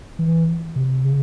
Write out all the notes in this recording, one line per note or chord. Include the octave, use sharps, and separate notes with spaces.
E3
C3
C#3